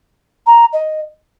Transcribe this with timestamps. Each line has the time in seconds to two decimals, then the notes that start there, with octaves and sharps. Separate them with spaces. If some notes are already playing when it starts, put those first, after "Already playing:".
0.47 A#5
0.73 D#5